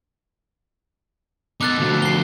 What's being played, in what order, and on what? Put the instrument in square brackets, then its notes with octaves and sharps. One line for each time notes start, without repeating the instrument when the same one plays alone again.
[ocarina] B3 [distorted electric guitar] D#4 A4 [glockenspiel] D6 F#6 A6
[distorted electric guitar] D2 F3 [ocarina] F#4
[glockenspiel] C7 G7